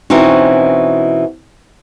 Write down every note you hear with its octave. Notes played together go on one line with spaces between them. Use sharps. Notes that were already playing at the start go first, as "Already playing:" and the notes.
B2 E3 C4 C#4 D#4 F#4